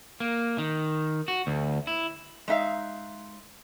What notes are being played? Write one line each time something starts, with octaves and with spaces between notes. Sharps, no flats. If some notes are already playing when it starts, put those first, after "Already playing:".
A#3
D#3
F#4
D2
E4
G#3 D#4 E5 F5